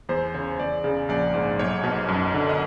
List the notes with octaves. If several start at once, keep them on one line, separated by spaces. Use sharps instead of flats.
E2 C5
C#3 C#5
E2 D5
C#3
A#1 D5
G#2
B1 C#5
B2
F#2
D3
D#5